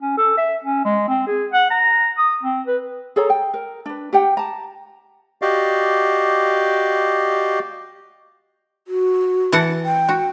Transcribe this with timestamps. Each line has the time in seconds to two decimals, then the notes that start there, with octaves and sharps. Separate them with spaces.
0.01 C#4
0.18 A4
0.37 E5
0.64 C#4
0.85 G#3
1.08 C4
1.27 G#4
1.52 F#5
1.70 A#5
2.18 D#6
2.43 C4
2.67 B4
3.16 G#4 A4 C#5 A#5
3.30 G5
3.54 A#4
3.86 D4 B4
4.13 G4 F#5 G5
4.37 A5 A#5
5.42 F#4 G4 D5 D#5 F5
8.88 F#4
9.52 E3 F#5 A5
9.85 G5
10.09 F#4